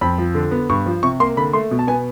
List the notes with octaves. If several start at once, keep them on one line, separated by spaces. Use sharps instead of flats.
F2 B5
F3
D3
B3
G2 C#6
F3
C3 C#6
A#3 C6
D3 B5
A3 C6
B2
A5
B3 G#5